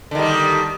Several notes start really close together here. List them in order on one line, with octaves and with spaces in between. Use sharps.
D3 D#3 G3